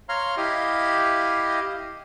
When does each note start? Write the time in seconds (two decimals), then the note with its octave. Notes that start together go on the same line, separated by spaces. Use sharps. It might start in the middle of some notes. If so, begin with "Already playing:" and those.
0.09 C#5 F5 A#5 C6 F6
0.37 E4 G4 D#5 F5